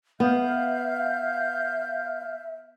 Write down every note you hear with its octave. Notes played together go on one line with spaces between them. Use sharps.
B3 E5 F5 F6 G6